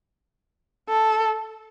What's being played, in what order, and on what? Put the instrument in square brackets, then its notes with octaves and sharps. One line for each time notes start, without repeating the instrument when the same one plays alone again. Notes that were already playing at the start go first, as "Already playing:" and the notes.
[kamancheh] A4